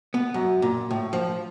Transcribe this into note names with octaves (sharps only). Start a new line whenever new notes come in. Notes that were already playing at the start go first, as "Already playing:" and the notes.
B3
F#2
A#2
A2
F3